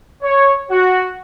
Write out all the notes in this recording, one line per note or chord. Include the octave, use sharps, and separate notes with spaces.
C#5
F#4